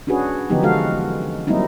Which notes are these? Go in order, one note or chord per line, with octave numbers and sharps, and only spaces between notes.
C#4 D4 F#4 G#4 B4
D3 F3 F#3 B3 D#4 G4
E3 G#3 F#4 A4 F5
F#3 G3 A#3 C4 D#4 E4